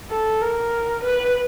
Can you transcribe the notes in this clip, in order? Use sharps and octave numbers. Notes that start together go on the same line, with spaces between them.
A4
A#4
B4